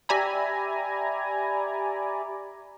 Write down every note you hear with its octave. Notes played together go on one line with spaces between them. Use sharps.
G4 D5 E5 G#5 A#5 B5